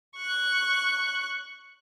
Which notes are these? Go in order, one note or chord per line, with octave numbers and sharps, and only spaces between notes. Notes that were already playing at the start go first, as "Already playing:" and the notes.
C#6 F#6